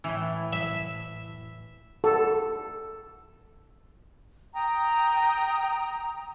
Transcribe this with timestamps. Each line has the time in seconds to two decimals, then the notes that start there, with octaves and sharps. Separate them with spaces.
0.04 A2 E3
0.53 E5
2.04 A4
4.54 G5 A#5 D#6